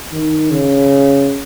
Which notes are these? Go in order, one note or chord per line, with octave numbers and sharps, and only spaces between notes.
D#3
C#3